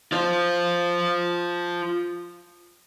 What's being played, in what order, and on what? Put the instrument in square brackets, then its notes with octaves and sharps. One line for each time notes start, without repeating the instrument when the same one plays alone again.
[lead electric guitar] F4 C5